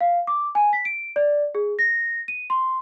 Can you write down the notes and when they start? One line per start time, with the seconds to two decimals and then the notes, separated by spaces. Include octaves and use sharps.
0.01 F5
0.27 D6
0.55 G#5
0.73 B6
0.85 D7
1.16 D5
1.55 G#4
1.79 A#6
2.28 D#7
2.50 C6